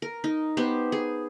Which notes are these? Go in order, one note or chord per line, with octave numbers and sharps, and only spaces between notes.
A#4
D#4
B3 G4 C5
G#4